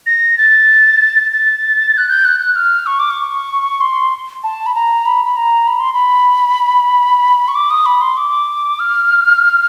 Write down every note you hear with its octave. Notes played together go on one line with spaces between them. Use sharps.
A#6
A6
A6
F#6
G6
F#6
F#6
F6
C#6
D6
C#6
C6
A5
B5
A#5
B5
B5
A#5
B5
C6
B5
C#6
D6
D#6
B5
C6
D6
F6